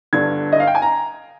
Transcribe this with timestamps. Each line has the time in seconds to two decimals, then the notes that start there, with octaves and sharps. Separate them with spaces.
0.13 G1 G2 D3 G#6
0.53 D#5
0.60 F5
0.67 G5
0.75 G#5
0.82 A#5